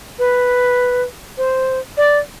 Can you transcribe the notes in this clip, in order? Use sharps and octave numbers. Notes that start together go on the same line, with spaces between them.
B4
C5
D5